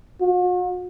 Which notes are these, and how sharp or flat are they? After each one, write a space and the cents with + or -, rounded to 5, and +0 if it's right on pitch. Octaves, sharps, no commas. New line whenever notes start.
F#4 -45